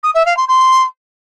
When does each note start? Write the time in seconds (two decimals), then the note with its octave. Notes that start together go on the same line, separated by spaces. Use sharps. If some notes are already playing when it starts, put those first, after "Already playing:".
0.03 D#6
0.14 E5
0.26 F5
0.37 C6
0.48 C6